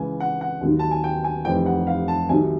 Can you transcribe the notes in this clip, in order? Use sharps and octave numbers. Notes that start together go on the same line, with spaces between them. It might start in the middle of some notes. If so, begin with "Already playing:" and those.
Already playing: C#2 C#3 E3 G#5
F#5
F#5
D#2 D#3 F#3
A5
G#5
G5
G#5
F1 F2 C3 E3 G5
F#5
F5
A5
C2 C3 D#3 F#3 G#5